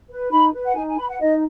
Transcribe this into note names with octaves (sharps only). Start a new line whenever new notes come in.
B4
D#4 B5
B4
F#5
D#4 G#5
G#5
B4 B5
F#5
D#4 D#5